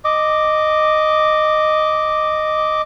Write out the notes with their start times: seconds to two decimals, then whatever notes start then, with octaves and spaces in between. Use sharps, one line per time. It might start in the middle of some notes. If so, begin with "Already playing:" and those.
0.05 D#5 D6